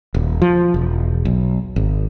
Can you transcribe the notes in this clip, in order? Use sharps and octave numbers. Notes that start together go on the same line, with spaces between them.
D#1
F3
E1
B1
G#1